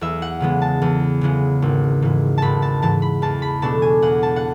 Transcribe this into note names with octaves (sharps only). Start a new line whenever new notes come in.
E2 E5
F#5
C#3 E3 G#3 B3
A5
E2
C#3 E3 G#3 B3
G#1
G#2 E3
G#1 A5 B5
A5
G#2 E3 A5
B5
E2 A5
B5
B2 A3 D4 A5
G#5
E2 F#5
A5
F#5